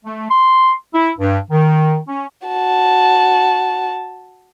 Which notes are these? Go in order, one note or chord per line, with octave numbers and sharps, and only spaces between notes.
A3
C6
E4
G2
D#3
C#4
F#4 A5